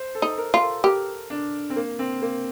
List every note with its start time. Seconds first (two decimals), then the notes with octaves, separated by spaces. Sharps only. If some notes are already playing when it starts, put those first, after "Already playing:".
Already playing: C5
0.15 A4
0.22 D#4
0.38 A#4
0.54 F4
0.61 A4
0.84 G4 A#4
1.30 D4
1.70 C4
1.76 A#3
1.99 C4
2.22 A#3